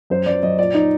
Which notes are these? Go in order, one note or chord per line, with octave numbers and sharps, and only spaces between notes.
F#2 C5
F#2 D5
F#2 D#5
A#2 D5
D#4